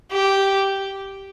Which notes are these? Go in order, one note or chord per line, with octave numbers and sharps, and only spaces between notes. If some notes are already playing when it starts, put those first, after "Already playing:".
G4